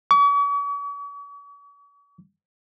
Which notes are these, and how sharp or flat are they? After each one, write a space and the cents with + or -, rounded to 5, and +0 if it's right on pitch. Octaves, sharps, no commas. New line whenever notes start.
C#6 +45